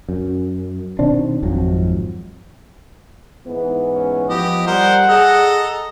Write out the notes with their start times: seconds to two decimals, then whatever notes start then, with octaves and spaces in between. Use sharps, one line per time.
0.09 F#2
0.99 B2 D#3 C4 D4
1.42 G#1 F2 F3 F#3
3.46 G#2 E3 B3
3.94 C#4
4.29 F3 B3 G4 D#5
4.67 G3 A#4 C5 F#5
5.08 G#4 A4 D#5 A#5